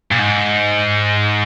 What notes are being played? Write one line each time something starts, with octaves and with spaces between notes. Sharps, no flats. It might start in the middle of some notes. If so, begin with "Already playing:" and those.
A#2
G#2